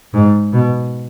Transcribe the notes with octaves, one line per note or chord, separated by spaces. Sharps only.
G#2
B2